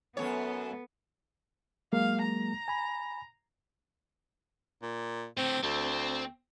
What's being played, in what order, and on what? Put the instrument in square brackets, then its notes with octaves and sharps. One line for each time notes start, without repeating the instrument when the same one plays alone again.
[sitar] F#2 E3 C#5 [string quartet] B3 [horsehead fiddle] A4
[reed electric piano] F#3 G#3 A#3 [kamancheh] F5
[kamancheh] A#5
[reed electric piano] G#5 B5
[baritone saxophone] A#2
[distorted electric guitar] A2 D3 [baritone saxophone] C4
[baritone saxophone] D2 [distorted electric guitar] C4